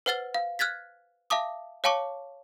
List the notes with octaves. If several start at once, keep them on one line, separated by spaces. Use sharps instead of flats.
B4 C5 F#5 F6 A6 G7
F5
F6 F#6 G#6 A6 B6
E5 F5 A5 D6 D#6
C#5 F5 G5 A5 C#6 D6